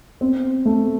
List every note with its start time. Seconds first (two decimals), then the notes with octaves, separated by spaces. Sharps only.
0.21 C4
0.65 A3